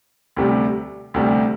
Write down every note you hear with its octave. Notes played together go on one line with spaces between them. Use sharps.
D2 C3 G3
D2 C3 G3